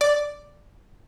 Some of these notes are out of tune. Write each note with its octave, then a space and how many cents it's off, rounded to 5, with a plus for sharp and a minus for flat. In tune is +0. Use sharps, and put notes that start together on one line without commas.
D5 +0 D6 -5